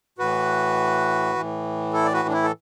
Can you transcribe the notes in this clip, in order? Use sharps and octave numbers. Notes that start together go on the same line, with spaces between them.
A2 E3 F#4 B4
A2 E3
E4 A4
D5
F#4 B4
D4
E4
A4